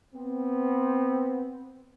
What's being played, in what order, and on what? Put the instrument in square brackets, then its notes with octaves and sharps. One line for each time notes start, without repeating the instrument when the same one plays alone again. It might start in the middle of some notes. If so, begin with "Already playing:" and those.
[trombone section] B3 C4